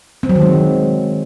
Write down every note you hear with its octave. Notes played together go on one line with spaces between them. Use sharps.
C4
F#3
D#3
G#3